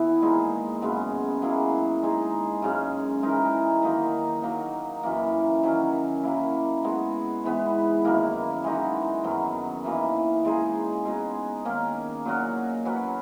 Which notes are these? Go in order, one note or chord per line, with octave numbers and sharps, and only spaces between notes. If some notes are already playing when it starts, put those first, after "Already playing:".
Already playing: E3 B3 E4
A#2 G#3 D#4 G#4
F#2 C#3 G#3 B3
F#3 A#3 E4 G#4
G#3 D#4 G#4
F#2 C#3 G#3 C#4
E3 G#3 D#4 A#4
D#3 F#3 A#3 D#4
F#3 A#3 D#4
F#2 E3 A#3
D#3 F#3 C#4
F#3 A#3 E4
G#3 B3 F#4
G#2 E3 B3
F#2 D#3 A#3 E4
E3 G#3 D#4 F#4
F#2 D#3 F#3 B3
F#2 E3 A#3 D#4
C#3 G#3 D#4 G#4
B2 G#3 D#4
D#3 A#3 C#4
A#2 F#3 C#4 F#4
F#3 C#4 F#4 B4